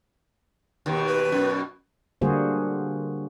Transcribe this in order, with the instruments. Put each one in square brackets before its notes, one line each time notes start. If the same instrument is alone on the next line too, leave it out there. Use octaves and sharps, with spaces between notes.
[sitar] D#2 B2 D#3
[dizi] B4
[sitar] F#2 B2
[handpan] D3 G3 A#3 F#4 G#4 C5